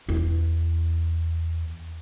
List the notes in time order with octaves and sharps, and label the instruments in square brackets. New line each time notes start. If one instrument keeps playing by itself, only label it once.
[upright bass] E2 E4